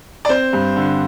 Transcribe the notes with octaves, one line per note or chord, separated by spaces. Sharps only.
D5
C4 C5
G2
D3